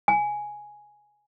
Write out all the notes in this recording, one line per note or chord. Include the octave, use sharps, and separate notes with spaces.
G#5